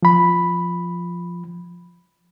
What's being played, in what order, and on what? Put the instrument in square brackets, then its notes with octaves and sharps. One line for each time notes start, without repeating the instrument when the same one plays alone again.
[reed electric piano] F3 B5